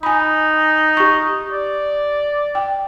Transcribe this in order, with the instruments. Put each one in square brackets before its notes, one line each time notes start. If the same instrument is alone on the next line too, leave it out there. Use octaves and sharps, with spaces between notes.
[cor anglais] D#4 [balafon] G#5 B5
[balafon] G4 C#6
[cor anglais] D5
[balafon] G5